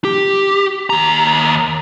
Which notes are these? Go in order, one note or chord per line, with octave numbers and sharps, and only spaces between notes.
G4
D#2 A#5